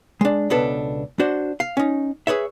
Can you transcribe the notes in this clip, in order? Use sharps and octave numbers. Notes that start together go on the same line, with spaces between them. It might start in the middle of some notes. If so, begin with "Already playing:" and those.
G#3 D4
C#2 B2 D4 A4 B4
D4 F#4 C5
F5
C#4 D#4
G#4 B4 C#5 E5